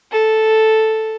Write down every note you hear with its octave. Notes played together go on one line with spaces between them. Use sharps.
A4